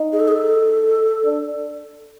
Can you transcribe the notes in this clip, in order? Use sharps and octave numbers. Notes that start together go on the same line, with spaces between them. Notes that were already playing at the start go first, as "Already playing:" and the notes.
Already playing: D#4
G#4
A4
G#4
A4
D4